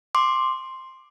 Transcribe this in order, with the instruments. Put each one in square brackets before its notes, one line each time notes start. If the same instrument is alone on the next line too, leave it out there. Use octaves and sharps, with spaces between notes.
[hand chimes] C6 D6